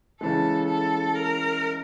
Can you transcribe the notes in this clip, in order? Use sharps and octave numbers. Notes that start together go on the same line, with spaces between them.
C#3 E3 G#3 A4
A4
A#4